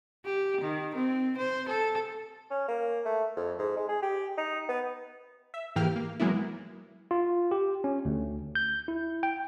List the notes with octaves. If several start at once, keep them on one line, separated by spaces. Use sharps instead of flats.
G4
D#3
C4
C5
A4
C#4
A#3
A3
F2
G#2
G#3
G#4
G4
D#4
B3
E5
G#2 E3 A#3 G4 G5 F6
A#3
E3 F#3 G#3 A#3 B3 E4
F4
G4
C#4
D2
G6
E4
G5